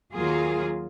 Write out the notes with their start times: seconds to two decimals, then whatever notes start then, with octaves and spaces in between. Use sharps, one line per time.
0.15 D#2 F#3 A#3 F4 G#4